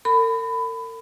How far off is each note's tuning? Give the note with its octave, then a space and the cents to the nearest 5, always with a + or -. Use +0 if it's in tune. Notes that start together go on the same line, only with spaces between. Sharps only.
A#4 -45 B5 +20